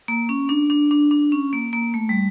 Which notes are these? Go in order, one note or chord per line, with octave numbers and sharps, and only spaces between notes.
A#3
C#4
D4
D4
D4
D4
C#4
A#3
A#3
A3
G3